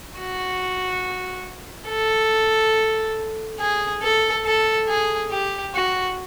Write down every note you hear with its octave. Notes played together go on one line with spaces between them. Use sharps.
F#4
A4
G#4
A4
A4
G#4
G4
F#4